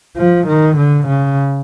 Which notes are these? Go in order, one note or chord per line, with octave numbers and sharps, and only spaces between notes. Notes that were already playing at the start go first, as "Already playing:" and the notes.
F3
D#3
D3
C#3